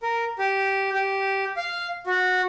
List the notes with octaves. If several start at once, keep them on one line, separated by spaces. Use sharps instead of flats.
A#4
G4
G4
F5
F#4